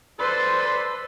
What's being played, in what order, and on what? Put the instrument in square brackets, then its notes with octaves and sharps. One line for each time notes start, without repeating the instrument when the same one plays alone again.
[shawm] A4 [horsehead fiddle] B4 C5 [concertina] D5 B5 C6